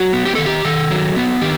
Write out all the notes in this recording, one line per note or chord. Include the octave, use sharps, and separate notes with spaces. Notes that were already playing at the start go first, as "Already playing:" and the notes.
Already playing: F#3 F#4
B3
G4
D#3 A4
G4
D#3 A4
F#3
B3
D#3 G4